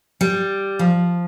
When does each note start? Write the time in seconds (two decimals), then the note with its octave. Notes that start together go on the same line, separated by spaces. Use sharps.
0.21 G3
0.79 F3